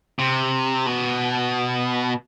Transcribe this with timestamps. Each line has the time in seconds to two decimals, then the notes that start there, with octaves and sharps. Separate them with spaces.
0.19 C3
0.86 B2